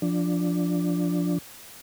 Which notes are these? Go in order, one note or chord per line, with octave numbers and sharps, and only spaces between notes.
F3 D4